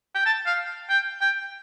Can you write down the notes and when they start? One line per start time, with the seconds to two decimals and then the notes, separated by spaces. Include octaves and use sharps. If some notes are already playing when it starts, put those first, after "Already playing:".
0.15 G5
0.26 A5
0.46 F5
0.90 G5
1.21 G5